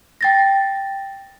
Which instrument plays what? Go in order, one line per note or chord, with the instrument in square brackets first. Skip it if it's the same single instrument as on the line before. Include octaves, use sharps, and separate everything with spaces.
[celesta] G5 A6 A#6